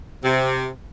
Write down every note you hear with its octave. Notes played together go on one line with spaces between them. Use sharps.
C3